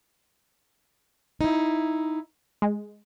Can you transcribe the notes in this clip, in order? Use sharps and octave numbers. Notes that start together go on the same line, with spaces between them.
D#4 E4
G#3